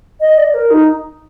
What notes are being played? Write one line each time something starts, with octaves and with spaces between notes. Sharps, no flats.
D#5
D5
A#4
D#4